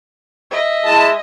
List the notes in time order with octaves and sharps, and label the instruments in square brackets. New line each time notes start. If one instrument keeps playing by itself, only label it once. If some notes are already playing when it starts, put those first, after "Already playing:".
[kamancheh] D#5 E5
[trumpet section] G#3 E4 [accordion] A5